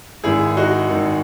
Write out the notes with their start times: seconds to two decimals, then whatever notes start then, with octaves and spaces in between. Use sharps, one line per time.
0.24 G#1 G#2 D#3 E4 G#4
0.57 D#4 F#4
0.90 G#1 G#2 D#3